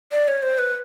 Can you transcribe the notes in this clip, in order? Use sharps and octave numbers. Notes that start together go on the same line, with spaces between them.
D5
C#5
C5
B4